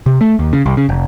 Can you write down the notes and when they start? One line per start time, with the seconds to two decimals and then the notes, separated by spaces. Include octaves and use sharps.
0.06 C3
0.21 A3
0.39 D#2
0.53 C#3
0.66 C2
0.77 C#3
0.89 F1